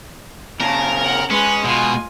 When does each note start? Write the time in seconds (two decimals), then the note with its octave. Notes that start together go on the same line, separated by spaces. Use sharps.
0.61 A#2 C#3 A#4 A5
1.00 F#5 A#5
1.31 G#3 C#4 B4 F#6
1.65 B2 F4 G#5